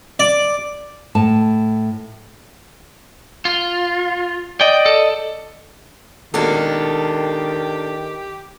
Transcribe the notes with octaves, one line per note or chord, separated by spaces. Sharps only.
D5
A2 A5
F4
D5 D#5 G5
A4
C#2 B2 D#3 A#3 D4 G4 A4